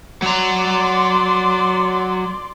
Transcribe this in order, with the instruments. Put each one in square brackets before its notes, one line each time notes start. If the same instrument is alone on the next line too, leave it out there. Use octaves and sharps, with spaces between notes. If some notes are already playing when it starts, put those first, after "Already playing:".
[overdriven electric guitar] F#3 A#5 [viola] D5 C6